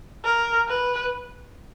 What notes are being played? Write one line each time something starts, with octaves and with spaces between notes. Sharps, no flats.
A#4
B4